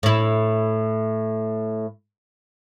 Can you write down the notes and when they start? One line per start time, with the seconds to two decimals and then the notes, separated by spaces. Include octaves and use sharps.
0.03 A2 E4